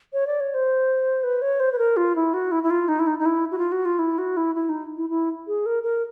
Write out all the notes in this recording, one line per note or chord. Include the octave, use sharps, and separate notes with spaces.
C#5
D5
C#5
C5
B4
C#5
C5
B4
A#4
F4
E4
F#4
E4
E4
F4
D#4
E4
D#4
D#4
E4
F#4
F4
F#4
F4
E4
F#4
E4
E4
D#4
E4
E4
G#4
A#4
A#4